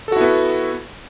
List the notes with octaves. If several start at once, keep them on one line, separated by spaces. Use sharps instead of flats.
B3 E4 F#4 A4